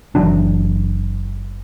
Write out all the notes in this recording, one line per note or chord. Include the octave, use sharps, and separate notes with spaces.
F#1 E3 F#3 D4